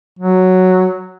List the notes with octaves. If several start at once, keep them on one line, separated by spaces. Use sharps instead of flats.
F#3